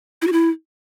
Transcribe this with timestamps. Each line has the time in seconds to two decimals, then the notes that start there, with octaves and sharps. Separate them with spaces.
0.22 E4
0.27 F#4
0.33 E4